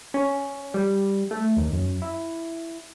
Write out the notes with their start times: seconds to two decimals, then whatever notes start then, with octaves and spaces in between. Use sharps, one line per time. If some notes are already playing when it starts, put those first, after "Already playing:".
0.14 C#4
0.74 G3
1.31 A3
1.57 D#2
1.73 F#2
2.02 E4